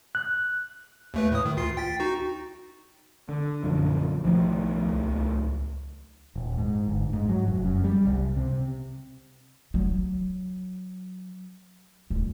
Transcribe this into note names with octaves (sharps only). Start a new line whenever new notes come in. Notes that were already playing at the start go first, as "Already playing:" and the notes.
F#6
D#2 A3 B4
A2 D#6
D#3
D2 F4 C7
G5 A6 B6
D#4 F#4
D3
A#1 F#2 D3 F3 C#4 D4
B1 A2 D#3 F3
C#2
D#1
G#2
G1
G#2
F#3
F1
F#2
G3
C2
C3
F#3
D1